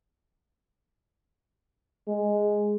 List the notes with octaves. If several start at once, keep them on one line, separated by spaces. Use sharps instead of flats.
G#3